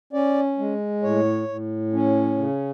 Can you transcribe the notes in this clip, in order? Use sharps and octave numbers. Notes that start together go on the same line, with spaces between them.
C#4 D5
G#3
A2 C#5
A2
C#4
C#3